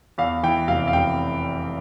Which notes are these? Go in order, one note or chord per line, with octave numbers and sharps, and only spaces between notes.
E2 F5
E3 G5
F1 F5
F5
F1 G5